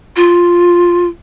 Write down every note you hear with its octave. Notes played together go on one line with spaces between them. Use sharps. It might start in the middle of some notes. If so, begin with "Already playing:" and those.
F4